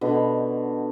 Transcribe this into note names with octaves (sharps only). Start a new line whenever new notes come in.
B2 D3